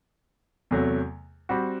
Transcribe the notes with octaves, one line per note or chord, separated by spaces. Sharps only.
E2 C3 F#3 A3
G3 C4 F#4